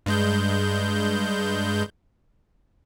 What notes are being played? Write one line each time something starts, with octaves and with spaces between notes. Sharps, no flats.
G2 G#3 G6